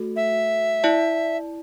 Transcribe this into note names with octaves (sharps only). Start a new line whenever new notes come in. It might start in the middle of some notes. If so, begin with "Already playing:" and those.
Already playing: A3 F#4 A4
E5
E4 D5 A5